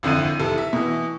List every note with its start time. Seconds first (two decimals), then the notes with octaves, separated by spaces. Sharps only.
0.03 G#1 F2 D3 E4 D#7
0.40 F1 E4 A4
0.58 E5
0.73 B2 E3